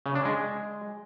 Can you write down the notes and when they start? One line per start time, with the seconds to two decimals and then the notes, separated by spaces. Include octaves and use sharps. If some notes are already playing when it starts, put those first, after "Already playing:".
0.06 C#3
0.15 D4
0.25 G#3